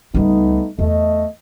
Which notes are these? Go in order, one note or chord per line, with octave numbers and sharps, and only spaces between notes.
C#2 G3 A3 B3 D#4
E2 A3 D#5